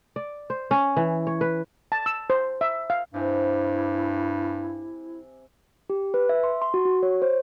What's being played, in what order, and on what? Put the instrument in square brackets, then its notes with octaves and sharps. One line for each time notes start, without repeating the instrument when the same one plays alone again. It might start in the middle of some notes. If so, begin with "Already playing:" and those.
[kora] D5
C5
C#4
E3
C#5
B4
[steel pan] A5
E6
C5
E5
F5
[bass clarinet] G2 [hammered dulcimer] C3 G#5 [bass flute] E4
[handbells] G4
B4
E5
C6
C6
F#4
F#4
C#5
C5